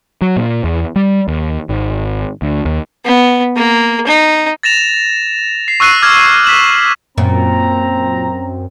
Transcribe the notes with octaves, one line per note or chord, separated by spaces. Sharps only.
F#3
A#2
E2
G3
D#2
G#1
D2
D#2
B3
A#3
D#4
A6 A#6 E7 F7
C7
C#6 E6 F#6 C7 D#7
D6 F6 G#6
B6 E7 F#7
F#2 A#2 C4 A#5